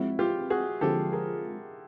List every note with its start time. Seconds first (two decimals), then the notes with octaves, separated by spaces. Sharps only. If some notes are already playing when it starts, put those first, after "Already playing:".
Already playing: F3 G#3 C4 E4 F#4
0.19 F4 G4
0.50 F#4 G#4
0.81 D3 F3 G#3 C4 F4 G4 A4
1.12 G#4 A#4